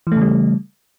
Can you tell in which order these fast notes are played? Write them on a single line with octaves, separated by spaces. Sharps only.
E3 A3 C#3 G3